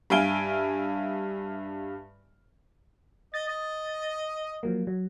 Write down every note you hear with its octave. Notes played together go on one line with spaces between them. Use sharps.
G2 E5 F5 G#5 D7 G7
D#5 A6
D#5
F3 F#3 A#3
F#3